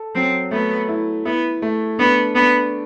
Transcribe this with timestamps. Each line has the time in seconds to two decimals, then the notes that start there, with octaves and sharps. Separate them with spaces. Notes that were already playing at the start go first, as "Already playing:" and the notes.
Already playing: A4
0.15 F#3 C4
0.51 A3 B3
0.89 E4
1.25 B3 E4
1.62 A3
1.99 B3 D4
2.35 B3 D4